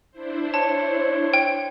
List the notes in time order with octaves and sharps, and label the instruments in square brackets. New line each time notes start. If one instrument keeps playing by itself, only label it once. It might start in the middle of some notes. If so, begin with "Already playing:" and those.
[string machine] D4 E4 C5
[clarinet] C#5 [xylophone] A5
[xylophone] G5